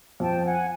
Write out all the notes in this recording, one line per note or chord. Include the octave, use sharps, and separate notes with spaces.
F2 G5 A5
F#5 G#5